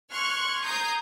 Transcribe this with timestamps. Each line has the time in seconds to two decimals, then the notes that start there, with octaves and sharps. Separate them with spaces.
0.10 C6 C#6 F6 F#6 G#6
0.62 A#5 D#6 G6 G#6 C7